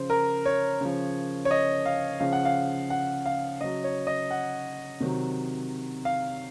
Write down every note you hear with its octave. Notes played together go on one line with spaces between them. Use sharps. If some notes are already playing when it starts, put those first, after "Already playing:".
Already playing: C#3 F3 C5
A#4
C#5
C#3 F3
C#5
D#5
F5
C#3 F3 F5
F#5
F5
F#5
F5
C#3 F#3 D#5
C#5
D#5
F#5
C3 D#3 F#3
F5